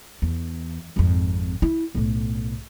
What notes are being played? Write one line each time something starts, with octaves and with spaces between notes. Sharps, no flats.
E2
G#1 F2
E4
B1 A2